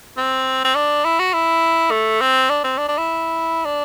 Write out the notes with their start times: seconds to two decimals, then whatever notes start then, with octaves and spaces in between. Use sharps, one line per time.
0.17 C4
0.65 C4
0.75 D4
1.05 E4
1.20 F#4
1.34 E4
1.91 A3
2.21 C4
2.50 D4
2.64 C4
2.78 D4
2.89 D4
2.98 E4
3.65 D4